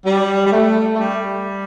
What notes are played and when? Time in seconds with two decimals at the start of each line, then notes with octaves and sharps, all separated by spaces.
0.06 G3
0.46 G3
0.52 A3
0.95 A3
0.98 G3